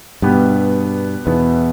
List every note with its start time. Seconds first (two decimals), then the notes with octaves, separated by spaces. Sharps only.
0.22 G2 B2 B3 G4 B4
1.26 E2 B2 B3 E4 B4